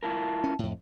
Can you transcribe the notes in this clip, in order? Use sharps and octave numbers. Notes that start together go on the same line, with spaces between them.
E4 F4 A#4 A5
C#4
F2 A2